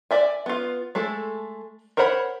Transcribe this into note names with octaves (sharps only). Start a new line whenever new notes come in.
D5 E5 G#5
B3 F4
G#3 A3 A4
A#4 C5 C#5 F#5 B5